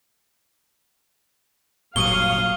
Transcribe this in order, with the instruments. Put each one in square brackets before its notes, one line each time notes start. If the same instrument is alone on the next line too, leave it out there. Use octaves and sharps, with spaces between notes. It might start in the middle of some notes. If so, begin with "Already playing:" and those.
[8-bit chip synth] G1 C#6 D#6 [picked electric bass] A#2 F#3 [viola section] F5 [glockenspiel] D#7 G7